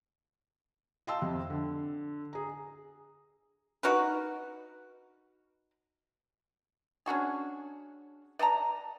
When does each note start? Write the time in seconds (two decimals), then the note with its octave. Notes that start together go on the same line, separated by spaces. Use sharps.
1.07 D#5 F5 G5 A5 C6 E6
1.22 F2 C3
1.50 D3
2.33 G#4 A#5
3.83 D#4 F#4 A#4 B4
7.06 C#4 D4 F#4 G#4
8.39 D5 D#5 A5 A#5